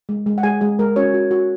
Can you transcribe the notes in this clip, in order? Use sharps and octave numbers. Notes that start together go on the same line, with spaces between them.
G#3
G#3
F#5
G#3 G#4 G#5
G#3 G#4
G#3 A#4
C#4 F#4 C#5
F#4
F#4